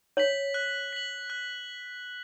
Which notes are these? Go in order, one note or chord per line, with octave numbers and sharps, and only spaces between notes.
C#5 B6 F#7
F#6
B6 F#7
F#6